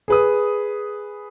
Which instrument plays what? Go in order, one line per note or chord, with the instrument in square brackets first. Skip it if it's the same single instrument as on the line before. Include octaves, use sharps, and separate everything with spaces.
[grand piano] G#4 B4 D#6